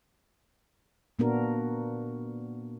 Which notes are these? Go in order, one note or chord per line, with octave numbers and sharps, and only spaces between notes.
A#2 A#3 B3 D4 F#4 A#4